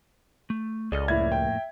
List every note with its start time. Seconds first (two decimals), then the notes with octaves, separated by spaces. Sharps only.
0.50 A3
0.92 C#2 G#4 A4 D5 D#5 F6
1.08 F2 A2 A#3 E4 E5 G#6
1.32 G5